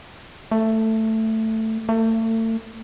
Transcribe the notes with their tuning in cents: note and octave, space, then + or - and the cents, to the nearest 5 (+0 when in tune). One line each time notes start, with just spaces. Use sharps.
A3 +10
A3 +35